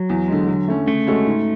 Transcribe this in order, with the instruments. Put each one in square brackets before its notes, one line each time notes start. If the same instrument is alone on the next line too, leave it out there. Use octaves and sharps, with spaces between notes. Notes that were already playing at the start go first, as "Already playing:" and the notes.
Already playing: [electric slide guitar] F#3
[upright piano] E2
D3 G#3
D3
A3 C#4
[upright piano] C#3 [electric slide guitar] A3
[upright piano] G#3 C#4 F#4 A4
G#2